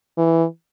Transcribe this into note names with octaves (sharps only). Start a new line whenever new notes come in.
E3